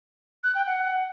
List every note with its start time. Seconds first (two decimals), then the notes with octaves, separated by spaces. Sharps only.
0.44 F#6
0.55 G5
0.67 F#5